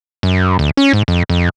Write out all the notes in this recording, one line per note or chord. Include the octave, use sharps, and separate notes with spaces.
F#2
D2
C#4
G#2
F2
F2